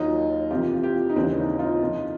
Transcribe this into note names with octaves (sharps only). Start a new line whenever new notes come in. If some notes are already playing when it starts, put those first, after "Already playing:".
Already playing: D#2 D#3 F#3 D#4 F4
F2 C3 E3 F4 G4
F4 G4
D#4
D#2 C#3 E3 C4 D4
C#4 D#4
D#4 F4
F2 C3 F3